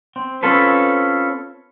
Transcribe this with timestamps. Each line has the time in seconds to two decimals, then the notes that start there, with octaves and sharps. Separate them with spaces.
0.16 C4
0.43 C4 C#4 F4 A4 B4